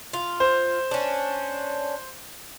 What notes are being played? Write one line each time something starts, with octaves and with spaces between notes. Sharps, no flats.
F4
C5
C#4 D4